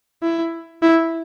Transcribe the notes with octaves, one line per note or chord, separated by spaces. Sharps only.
E4
E4